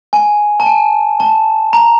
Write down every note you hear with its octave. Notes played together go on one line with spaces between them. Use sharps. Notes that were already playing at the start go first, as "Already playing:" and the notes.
G#5
A5
G#5
A5
A#5